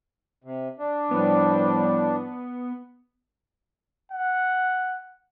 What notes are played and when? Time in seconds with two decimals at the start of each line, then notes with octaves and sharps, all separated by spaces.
0.44 C3
0.79 D4
1.11 A2 F3 G3 B3
4.12 F#5